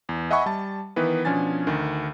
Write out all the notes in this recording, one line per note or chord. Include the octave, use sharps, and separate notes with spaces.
E2
D#5 E5 F#5 G#5 B5 C#6
G3 A5
D#3 E3 B3 B4
B2 F3 C#4 D4 G#5 A6
D2 D#3